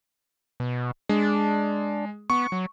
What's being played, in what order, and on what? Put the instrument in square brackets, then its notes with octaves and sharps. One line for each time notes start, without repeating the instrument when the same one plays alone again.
[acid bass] B2
[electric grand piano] G#3 [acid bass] D4
[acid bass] B3 [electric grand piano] C#6
[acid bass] F#3